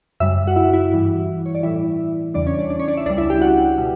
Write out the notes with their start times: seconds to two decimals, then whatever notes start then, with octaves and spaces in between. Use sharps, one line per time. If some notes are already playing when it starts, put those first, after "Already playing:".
0.20 F#2 C#3 G3 E5 E6
0.47 F#4 F#5
0.56 E4 E5
0.73 E4 E5
0.92 G2 E3 G3
1.46 C#5
1.55 D5
1.63 A2 E3 G3 E4 E5
2.34 E2 C#3 E3 G3 D4 D5
2.46 C#4 C#5
2.58 D4 D5
2.70 D4 D5
2.79 C#4 C#5
2.88 D4 D5
2.97 E4 E5
3.06 C#2 C#3 G3 D4 D5
3.18 E4 E5
3.30 G4 G5
3.42 F#4 F#5
3.78 B2 G3